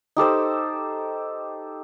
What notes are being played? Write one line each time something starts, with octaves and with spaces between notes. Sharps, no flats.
D#4 G4 A4 C5